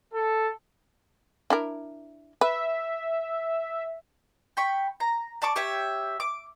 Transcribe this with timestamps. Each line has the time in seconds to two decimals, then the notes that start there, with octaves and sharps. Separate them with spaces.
0.12 A4
1.50 D4 E4 A#4
2.41 B4 E5
4.57 G5 B5 C#6
5.00 A#5
5.42 D5 A5 C#6 D6
5.56 G4 C#5 E5
6.20 D6